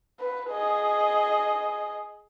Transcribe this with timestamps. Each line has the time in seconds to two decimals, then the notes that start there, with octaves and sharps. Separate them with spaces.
0.20 B4
0.50 G#4 D#5